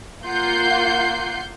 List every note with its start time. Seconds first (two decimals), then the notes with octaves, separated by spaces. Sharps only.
0.24 A#3 F4 F#5 G6 C7